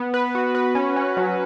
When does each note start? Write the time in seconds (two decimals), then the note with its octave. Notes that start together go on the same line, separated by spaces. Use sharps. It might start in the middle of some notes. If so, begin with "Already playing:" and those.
Already playing: B3
0.14 B4
0.35 F#4
0.55 B4
0.75 C#4
0.96 C#4
1.17 F#3